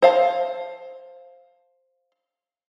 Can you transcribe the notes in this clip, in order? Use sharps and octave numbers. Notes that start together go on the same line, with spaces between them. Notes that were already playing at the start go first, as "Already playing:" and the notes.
C5 F5 A5